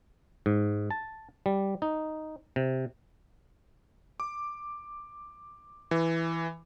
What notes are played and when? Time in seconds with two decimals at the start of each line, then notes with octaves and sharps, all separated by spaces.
0.46 G#2
0.91 A5
1.46 G3
1.82 D#4
2.56 C3
4.20 D6
5.91 E3